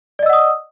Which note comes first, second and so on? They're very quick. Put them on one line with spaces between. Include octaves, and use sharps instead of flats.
D5 D#5 E6 F#5 D#6